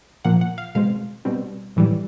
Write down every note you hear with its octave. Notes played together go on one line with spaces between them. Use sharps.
A#2 F3 A#3 F#5
F#5
F5
B2 G#3 C4 F5
B2 G3 C4
A2 E3 G3